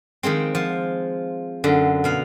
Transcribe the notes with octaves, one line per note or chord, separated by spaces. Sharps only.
D#3 F3 G#3 C4
F3
F#2 D3
B2 F5 F#5